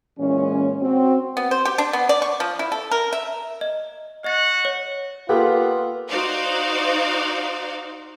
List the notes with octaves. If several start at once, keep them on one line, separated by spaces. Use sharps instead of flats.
A#2 E3 G#3 C#4
C4 F#4
B3
C5
G4
D4
B3
D5
C#6
F3
E4
A4
A#4
E5
D#5
F#4 D#5 F#5 A6
C#5
A#3 B3 F4 G4 A4
D#4 F#4 C5 D5 F5